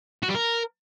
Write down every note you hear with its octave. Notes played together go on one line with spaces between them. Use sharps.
F#4
G3
A#4